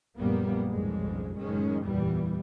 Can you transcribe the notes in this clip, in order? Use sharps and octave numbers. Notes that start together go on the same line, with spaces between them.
A#1 F#2 G3 A#3 B3
B1 F2 G#2 C#3 G3 G#3
F#1 F#2 A2 D#3 G#3 C#4
E2 A#2 E3 G3 B3